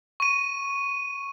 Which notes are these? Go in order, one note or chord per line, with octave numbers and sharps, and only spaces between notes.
C#6 D#7